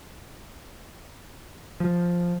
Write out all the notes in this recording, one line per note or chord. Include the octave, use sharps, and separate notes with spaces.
F3